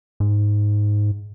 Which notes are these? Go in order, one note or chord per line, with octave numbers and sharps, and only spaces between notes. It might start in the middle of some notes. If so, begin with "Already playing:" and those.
G#2